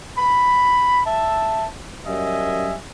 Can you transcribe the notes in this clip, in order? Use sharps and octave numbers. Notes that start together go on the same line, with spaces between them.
B5
E5 A5
F#2 G3 D#5 E5 G#5